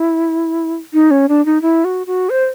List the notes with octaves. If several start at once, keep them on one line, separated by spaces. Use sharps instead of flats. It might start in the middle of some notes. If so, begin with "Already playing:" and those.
Already playing: E4
D#4
C#4
D4
D#4
E4
F#4
F#4
C5